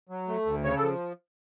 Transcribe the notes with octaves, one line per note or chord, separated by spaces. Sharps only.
F#3
A3
D2
C#3 C#5
A4
F3